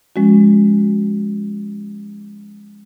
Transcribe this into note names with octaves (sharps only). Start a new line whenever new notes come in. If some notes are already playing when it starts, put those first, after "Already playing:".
F3 G#3 C#4 F#4